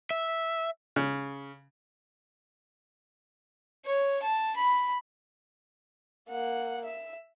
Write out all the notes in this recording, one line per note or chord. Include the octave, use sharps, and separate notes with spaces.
E5
C#3
C#5
A5
B5
A#3 F#5
E5